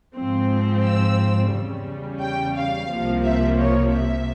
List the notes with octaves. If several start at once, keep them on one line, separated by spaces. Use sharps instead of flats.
G#2 F3 C4
E6
E2 C#3 G3 C#4
G5
F5
C2 C3 F3 A#3
E5
C#5
E5